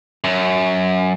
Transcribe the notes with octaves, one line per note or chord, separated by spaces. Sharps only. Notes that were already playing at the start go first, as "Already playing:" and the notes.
F#2